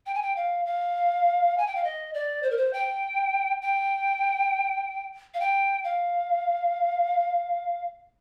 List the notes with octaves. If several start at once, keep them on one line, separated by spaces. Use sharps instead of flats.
G5
G#5
G5
F5
F5
G#5
G5
F5
D#5
D5
C5
A#4
C5
G5
G5
F5
G5
F5